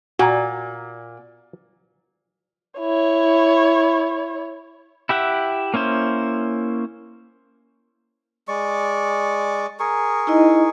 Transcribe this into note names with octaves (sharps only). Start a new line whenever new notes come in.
A#2 F#4 A#5
E4 C#5
E4 G4 E5 F#5
A#3 C#4 E4 C5
G#3 D5 C#6
G#4 A#4 C#6
D#4 E4 D#5